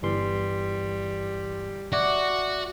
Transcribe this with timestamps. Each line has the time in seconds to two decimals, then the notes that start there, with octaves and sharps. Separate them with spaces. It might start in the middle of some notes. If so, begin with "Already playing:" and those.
0.02 G1 E3 G3 C6
1.92 F#4 D5 E5 D6